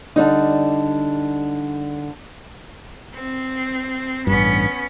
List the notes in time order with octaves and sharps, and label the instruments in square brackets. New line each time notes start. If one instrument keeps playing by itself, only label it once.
[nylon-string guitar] D3 G3 D#4
[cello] C4
[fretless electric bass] A1 G2 [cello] B3 C#4